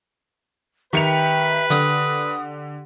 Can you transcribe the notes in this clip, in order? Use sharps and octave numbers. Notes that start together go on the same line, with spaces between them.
D#3 G4 B4 E5 C#7 F7
D3 D#6